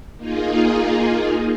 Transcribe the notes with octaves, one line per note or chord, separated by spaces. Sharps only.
A#3 D#4 F4 G#4